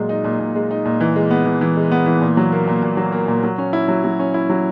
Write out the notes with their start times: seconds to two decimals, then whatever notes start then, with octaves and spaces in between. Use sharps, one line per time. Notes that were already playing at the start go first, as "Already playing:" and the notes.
Already playing: A#2 F#3 G#3
0.09 D#4
0.24 A#2
0.40 A#2
0.55 G#3
0.71 D#4
0.86 A#2
1.01 E3
1.16 G#3
1.31 B3
1.46 E3
1.61 E3
1.77 G#3
1.91 B3
2.06 E3
2.22 A#2
2.37 F#3
2.52 A#3
2.68 A#2
2.82 A#2
2.97 F#3
3.12 A#3
3.28 A#2
3.43 F#3
3.58 C#4
3.73 E4
3.88 F#3
4.04 F#3
4.19 C#4
4.34 E4
4.50 F#3